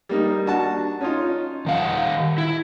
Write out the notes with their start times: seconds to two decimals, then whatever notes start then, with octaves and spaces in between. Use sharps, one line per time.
0.09 G3 A#3 D#4
0.46 D4 F#4 A5
1.01 C#4 D#4 F4
1.66 D#3 F5 F#5
2.38 E4